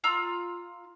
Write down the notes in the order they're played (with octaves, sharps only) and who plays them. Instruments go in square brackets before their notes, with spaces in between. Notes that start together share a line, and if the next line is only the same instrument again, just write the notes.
[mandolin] F4 A#5 E6